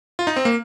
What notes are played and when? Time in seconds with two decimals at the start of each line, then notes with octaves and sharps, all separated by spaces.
0.19 F4
0.27 D#4
0.36 C4
0.45 A#3